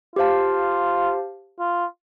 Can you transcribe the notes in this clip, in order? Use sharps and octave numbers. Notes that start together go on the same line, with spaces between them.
F4 G4 C5 F5 A5
F4